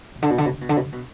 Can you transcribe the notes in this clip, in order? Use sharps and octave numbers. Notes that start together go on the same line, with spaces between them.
B2
D3
B2
D3
B2
D3
B2
D3
B2
D3
B2